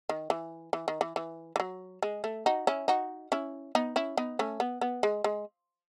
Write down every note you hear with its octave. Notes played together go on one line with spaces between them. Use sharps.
D#3
E3
E3
D#3
E3
E3
E3
F#3
G#3
A3
D#4 F#4
C#4 E4
D#4 F#4
C#4 E4
B3 D#4
C#4 E4
B3 D#4
A3 C#4
B3
B3
G#3
G#3